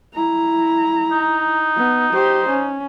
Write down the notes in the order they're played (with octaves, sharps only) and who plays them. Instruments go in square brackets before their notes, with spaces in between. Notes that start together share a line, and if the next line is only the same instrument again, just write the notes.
[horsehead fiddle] E4 A#5
[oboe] D#4
[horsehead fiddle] B3
G4 C5
C#4